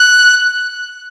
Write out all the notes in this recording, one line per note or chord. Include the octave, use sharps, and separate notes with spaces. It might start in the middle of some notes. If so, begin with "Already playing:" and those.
Already playing: F#6